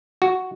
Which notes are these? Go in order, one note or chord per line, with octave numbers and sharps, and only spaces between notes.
F#4